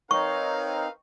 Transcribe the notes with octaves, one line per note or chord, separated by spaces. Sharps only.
C4 D#4 A#4 B4 C#5 F5 C#6